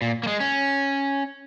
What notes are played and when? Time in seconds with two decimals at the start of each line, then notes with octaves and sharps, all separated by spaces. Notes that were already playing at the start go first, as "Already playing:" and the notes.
0.02 A#2
0.23 A#3
0.27 G#3
0.40 C#4